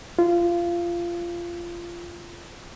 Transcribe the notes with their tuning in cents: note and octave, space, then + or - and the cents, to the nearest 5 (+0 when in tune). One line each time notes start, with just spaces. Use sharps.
F4 -20